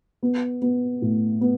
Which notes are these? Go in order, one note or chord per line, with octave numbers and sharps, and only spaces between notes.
B3
B3
A2
B3